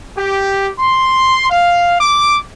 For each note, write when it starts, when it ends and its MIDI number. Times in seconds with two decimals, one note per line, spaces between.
0.17 0.70 67
0.79 1.48 84
1.50 1.97 77
2.01 2.39 86